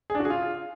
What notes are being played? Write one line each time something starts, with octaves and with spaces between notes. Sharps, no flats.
G#4
D4
F#4
G#4
F4